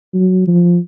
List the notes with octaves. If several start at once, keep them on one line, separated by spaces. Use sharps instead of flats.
F#3
F3